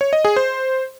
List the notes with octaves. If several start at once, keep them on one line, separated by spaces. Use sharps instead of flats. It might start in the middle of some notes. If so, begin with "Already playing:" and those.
C#5
D#5
G#4
C5